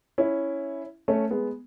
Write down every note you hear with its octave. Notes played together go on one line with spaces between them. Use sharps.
C#4 E4
A3 C#4
G#3 B3